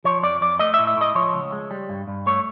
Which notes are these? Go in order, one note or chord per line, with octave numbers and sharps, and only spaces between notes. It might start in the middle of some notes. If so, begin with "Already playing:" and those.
F3 C#5
F2 D5
F2 D5
A3 D#5
E5
A2
E5
A2 D#5
F3 C#5
C#2
G#3
G3
G2
G2
A3 C#5